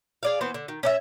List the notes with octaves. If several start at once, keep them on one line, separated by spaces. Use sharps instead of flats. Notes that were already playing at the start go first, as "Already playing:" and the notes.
G#4 D5 F5
E3 B3 C4 C5
D3
D#3
C#4 D4 E5